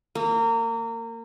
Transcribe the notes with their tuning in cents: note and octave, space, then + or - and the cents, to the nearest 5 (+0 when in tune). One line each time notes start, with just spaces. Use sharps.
A#3 -25